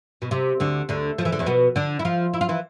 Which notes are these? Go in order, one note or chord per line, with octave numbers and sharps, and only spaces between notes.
B2
C3
D2 D3
D2 D3
F3
E3
D3
E2 E3
B2 B3
D3 D4
E4
F3 F4
E4
F4
E3 E4